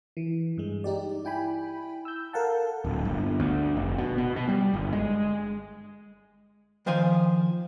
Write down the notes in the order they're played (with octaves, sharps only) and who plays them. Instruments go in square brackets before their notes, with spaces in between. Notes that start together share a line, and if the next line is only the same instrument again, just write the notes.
[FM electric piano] E3
G2 G#3
D#4 G4 D5
E4 G5 G#5 B5
E6 G6
A4 A#4 F5 F#5 A5
[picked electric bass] D1
G1
D2
F1
B2
B2
B2
G3
G1
G#3
[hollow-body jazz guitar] D#3 F3 C5 F5 G#5